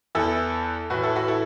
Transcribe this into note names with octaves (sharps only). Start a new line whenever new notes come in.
E2 E3 E4 A4
A2 E3 F#4 B4
E4 A4
F#4 B4
E4 A4